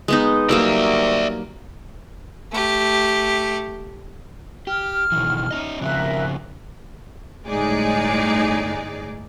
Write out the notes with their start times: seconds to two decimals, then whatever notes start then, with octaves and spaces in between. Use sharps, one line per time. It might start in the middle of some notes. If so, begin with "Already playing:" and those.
0.08 G#3 B3 D#4
0.49 F#3 G3 A#3 D5 E5
2.52 A3 G4
4.67 G4 F6
5.12 B2 D#3 E3
5.51 C#4 D#4 D#5
5.81 C#3 F3 C4 A#4 E5 F#6
7.47 G1 A2 G#3 D#4 G#4 D5